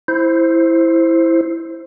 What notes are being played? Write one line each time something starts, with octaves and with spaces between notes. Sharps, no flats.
E4 C5